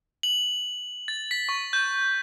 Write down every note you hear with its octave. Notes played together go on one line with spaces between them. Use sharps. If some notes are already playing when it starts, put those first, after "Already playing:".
F#7
A6
B6
C#6
G6